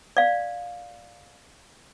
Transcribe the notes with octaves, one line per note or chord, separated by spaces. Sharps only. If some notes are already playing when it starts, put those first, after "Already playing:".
D5 F5